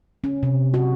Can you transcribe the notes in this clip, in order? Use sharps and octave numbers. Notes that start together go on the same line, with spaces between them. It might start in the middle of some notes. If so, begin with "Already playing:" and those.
C#4
C3
F#4